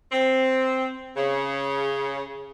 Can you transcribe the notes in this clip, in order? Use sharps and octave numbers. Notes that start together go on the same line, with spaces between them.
C4
C#3